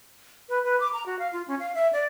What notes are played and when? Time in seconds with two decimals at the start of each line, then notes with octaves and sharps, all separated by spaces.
0.49 B4
0.64 B4
0.80 D6
0.93 A#5
1.06 F#4
1.19 F5
1.33 F4
1.48 C#4
1.60 F5
1.75 E5
1.93 D5